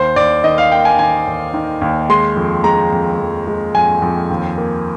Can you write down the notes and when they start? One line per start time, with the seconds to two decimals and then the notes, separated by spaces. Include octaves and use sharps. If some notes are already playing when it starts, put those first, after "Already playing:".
Already playing: D#2 C5
0.16 D#2 D5
0.44 D#3 D#5
0.58 F5
0.71 A#3 G5
0.85 G#5
0.98 D#3 G#5
1.27 D#2
1.54 D#3
1.81 D#2
2.09 G#3 C6
2.36 F2
2.64 G#3 A#5
2.92 F2
3.20 F2
3.47 G#3
3.75 F2 G#5
4.02 F2
4.30 D#2
4.58 A#3